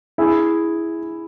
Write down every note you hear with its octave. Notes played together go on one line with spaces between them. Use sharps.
E4 G#4